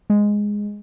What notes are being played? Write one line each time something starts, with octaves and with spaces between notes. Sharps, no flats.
G#3